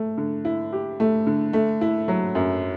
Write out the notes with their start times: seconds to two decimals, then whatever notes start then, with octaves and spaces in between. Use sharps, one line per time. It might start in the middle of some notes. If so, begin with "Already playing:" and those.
Already playing: A3
0.18 D3
0.45 E4
0.73 G4
1.00 A3
1.27 D3
1.53 A3
1.81 E4
2.08 F#3
2.35 F#2